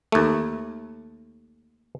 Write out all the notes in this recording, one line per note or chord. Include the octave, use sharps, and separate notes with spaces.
D#2 A3